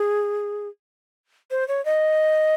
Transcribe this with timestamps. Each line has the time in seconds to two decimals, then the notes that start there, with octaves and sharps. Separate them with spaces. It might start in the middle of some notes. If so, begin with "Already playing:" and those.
Already playing: G#4
1.51 C5
1.68 C#5
1.85 D#5